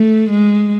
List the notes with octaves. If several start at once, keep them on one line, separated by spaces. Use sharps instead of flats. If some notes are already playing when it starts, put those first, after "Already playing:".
Already playing: A3
G#3